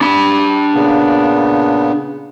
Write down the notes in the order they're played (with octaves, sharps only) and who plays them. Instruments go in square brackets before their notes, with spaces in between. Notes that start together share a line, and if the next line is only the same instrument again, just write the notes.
[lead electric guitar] D4 B5
[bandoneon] A#2 C#3 B3